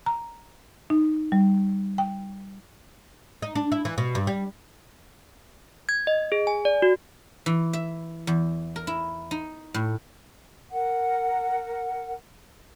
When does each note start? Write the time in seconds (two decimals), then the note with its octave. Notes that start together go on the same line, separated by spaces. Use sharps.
0.06 A#5
0.90 D#4
1.32 G3
1.98 G5
3.42 D#4
3.55 D4
3.72 E4
3.85 E3
3.98 B2
4.15 G2
4.27 G3
5.89 G#6
6.07 D#5
6.32 G#4
6.47 G#5
6.65 D5
6.82 F#4
7.46 E3
7.73 E5
8.27 E2
8.76 A#4
8.87 E4
9.31 D#4
9.74 A2
10.72 A#4 F#5